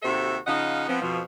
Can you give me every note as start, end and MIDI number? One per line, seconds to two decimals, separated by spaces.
0.02 0.37 39
0.02 0.37 48
0.02 0.37 66
0.02 0.37 69
0.02 0.37 72
0.02 0.37 76
0.47 0.85 49
0.47 0.85 53
0.47 0.85 63
0.47 0.85 75
0.47 0.85 77
0.47 0.85 78
0.88 1.01 53
0.88 1.01 59
0.88 1.01 60
1.01 1.19 41
1.01 1.19 47
1.01 1.19 53